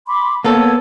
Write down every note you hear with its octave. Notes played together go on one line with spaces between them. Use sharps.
B5 C6 D6
A#3 B3 A4 C#5 A5 E6